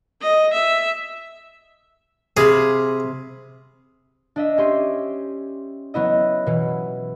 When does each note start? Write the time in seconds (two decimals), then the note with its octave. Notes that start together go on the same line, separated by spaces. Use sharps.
0.22 D#5
0.54 E5
2.37 C3 G#4 F5 B5
4.36 D4 D#5 E5
4.58 C#4 G4 C6 D#7
5.94 F#3 B3 E4 D#5
6.46 B2 E3